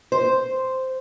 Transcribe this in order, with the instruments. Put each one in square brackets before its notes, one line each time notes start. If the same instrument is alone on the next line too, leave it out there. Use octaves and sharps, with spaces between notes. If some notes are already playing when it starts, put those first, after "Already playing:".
[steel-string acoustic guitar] C5